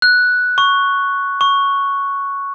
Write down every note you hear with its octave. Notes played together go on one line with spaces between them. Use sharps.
F#6
C#6
C#6